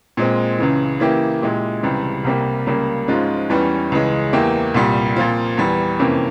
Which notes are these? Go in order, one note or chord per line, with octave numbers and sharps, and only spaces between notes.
A#2 G#3 C4
C#2 C#3 E3
C#3 E3 A#3 E4 G4
A#2 G#3 E4 G4
C#2 C3 E3 G3
C2 C3 G3 A#3
C#2 C#3 G3 A#3
G#2 F3 G#3 C#4 F4
E2 E3 G3 C#4
C#2 C#3 E3 G#3
E2 E3 A#3 E4 G4
C2 A#2 G3
A#2 F3 C4 F4
E2 E3 G3
F2 C3 E3 A#3 C#4